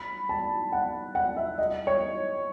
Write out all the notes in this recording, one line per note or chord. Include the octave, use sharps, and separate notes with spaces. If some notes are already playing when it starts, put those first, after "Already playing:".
Already playing: B5
A5
F#5
F#5
E5
D#5
C#5